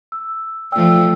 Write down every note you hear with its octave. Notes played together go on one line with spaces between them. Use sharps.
E6
F3 A3 F4 D5 G5 E6